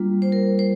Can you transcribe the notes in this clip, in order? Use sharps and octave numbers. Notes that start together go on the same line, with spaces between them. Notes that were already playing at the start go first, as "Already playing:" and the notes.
Already playing: G3 A#3 D4 F4
C5
A#4
C5